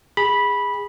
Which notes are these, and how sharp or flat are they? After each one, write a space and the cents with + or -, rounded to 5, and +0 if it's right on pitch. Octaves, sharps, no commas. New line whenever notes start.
G#4 -20 B5 -10